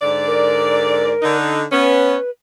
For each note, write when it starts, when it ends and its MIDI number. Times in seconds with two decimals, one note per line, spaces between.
0.02 1.12 44
0.02 1.12 50
0.02 1.12 74
0.27 1.37 70
1.22 1.64 50
1.22 1.64 63
1.72 2.16 59
1.72 2.16 61
1.72 2.30 71